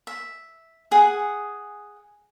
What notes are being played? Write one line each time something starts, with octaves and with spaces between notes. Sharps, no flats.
E5
G#4 F#5